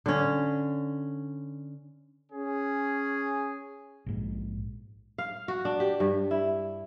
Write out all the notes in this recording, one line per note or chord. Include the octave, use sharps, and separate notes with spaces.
D3 C#4
C#4 G#4
A#1 G#2
F5
F#4
D4
G4
G2
E4